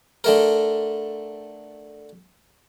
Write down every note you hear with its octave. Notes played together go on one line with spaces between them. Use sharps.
D3 A3 A#4